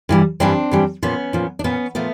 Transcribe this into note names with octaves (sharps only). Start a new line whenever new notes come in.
G2 E3 G3
G2 E3 G3 C4 D4
G2 E3 G3
A#2 F3 B3 C#4
A#2 F3
D4
A#2 F3 B3 C#4
A#2 F3 A3 B3